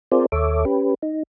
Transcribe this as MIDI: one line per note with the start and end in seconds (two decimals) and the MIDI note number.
0.12 0.26 60
0.12 0.26 65
0.12 0.26 68
0.12 0.26 70
0.12 0.26 72
0.12 0.26 74
0.32 0.65 39
0.32 0.65 69
0.32 0.65 73
0.32 0.65 76
0.32 0.65 86
0.65 0.94 61
0.65 0.94 67
0.65 0.94 71
1.03 1.23 63